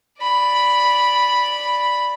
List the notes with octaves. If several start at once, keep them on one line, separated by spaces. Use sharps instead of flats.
D5 B5